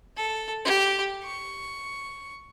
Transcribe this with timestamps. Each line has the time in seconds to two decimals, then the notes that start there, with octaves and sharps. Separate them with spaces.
0.16 A4
0.65 G4
1.23 C#6